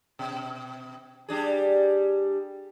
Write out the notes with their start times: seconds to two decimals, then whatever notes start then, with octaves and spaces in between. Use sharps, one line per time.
0.19 B2
1.29 G3 D4 G#4